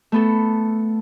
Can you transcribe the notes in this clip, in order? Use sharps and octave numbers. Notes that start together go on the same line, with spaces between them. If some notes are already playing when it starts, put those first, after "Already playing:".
A3 B3 A4